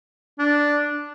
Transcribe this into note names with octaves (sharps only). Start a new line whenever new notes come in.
D4